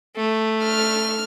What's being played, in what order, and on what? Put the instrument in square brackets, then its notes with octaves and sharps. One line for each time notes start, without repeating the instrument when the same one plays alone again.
[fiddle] A3
[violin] F6